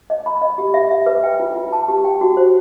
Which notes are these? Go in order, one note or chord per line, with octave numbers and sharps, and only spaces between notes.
D#5
B5
D#5
G4
E5
E5
B4
G5
F4
F4
A5
G4
G5
F#4
C5